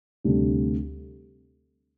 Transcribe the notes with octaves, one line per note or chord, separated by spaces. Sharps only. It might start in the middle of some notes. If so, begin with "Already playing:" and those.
D2 C3 G3 D4